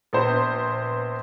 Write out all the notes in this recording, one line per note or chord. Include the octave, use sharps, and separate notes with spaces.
A#1 B3 C5